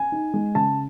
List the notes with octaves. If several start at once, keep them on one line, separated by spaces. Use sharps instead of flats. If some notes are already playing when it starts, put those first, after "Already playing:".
Already playing: G#5
D#4
G#3
C#3 A5